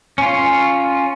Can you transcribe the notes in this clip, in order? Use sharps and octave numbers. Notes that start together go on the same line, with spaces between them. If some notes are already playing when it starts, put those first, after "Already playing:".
C#4 F4